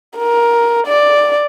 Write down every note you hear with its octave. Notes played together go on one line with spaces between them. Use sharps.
A#4
D5